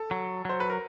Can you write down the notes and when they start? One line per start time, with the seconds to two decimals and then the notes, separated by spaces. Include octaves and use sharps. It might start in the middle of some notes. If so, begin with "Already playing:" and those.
Already playing: A4
0.11 F#3
0.45 F#3 C5
0.60 B4
0.70 A#4